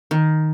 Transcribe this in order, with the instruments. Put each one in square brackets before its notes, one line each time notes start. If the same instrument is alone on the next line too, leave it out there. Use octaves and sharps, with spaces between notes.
[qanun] D#3